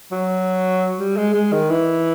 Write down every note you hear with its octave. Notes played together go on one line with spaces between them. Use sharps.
F#3
G3
G#3
G#3
D#3
E3